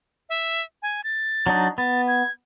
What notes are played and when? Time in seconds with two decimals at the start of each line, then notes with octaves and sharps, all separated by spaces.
0.29 E5
0.82 G#5
1.04 A6
1.47 F#3 D4 D#4
1.78 B3 A6
2.08 G#6